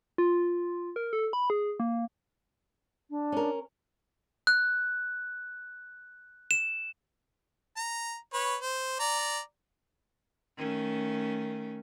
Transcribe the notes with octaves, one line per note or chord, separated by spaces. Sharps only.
F4
A#4
A4
B5
G#4
A#3
D4
C#4 A#4
F#6
E7
A#5
B4 C#5
C5
D5 A#5
D#3 A3 C#4